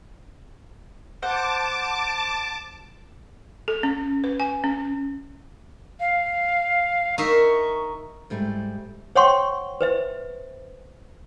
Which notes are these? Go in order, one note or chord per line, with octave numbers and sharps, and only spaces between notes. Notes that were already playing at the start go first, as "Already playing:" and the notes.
C5 F#5 A5 D6
A4
C#4
B4
G#5
C#4
F5
D#4 A#4 E5 C#6
G#2 G3 A3
C5 C#5 F#5 G5 C6 C#6
B4 C5 E5